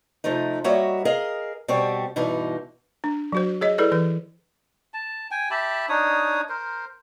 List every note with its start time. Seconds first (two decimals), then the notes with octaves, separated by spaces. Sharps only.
0.24 C3 F3 A3 D#4
0.64 G3 A#3 F#4 C#5 D#5 E5
1.05 G#4 A#4 D#5 F5
1.68 B2 G3 C4 G4 C#5
2.16 G2 B2 E3 D#4
3.04 D4
3.32 F#3 F#4 C5
3.61 G#4 C#5 D#5
3.78 E4 G#4 A4 B4 D5
3.92 E3 B4
4.94 A5
5.31 G5 G#5
5.51 G4 E5 A5 B5
5.89 D4 D#4 C#5 D#6
6.49 A#4 C5